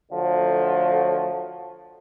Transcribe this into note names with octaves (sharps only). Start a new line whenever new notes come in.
D3 F3 F#3 A3